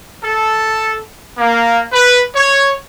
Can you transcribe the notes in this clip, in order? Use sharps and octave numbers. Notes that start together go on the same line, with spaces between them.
A4
A#3
B4
C#5